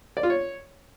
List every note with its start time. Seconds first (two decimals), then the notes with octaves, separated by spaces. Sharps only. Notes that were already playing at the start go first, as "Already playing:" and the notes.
0.17 D5
0.23 F4
0.30 C#5